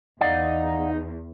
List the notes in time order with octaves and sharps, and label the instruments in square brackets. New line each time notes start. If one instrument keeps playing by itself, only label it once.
[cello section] E2 [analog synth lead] D#4 [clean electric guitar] D5 F5 F#5